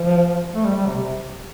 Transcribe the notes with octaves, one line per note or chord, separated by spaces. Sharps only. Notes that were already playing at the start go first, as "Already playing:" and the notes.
Already playing: F3
A3
G3
G3
C3
C3